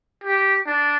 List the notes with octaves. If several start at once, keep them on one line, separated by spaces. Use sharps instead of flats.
G4
D4